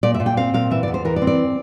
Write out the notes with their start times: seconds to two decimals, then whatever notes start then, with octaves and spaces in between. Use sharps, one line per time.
0.03 A#2 D5
0.14 E5
0.20 A#2
0.26 G5
0.37 C4 F5
0.54 A#2 F5
0.71 E3 E5
0.83 D5
0.88 E2
0.94 C5
1.05 E3 A#4
1.16 D5
1.22 C4
1.27 D5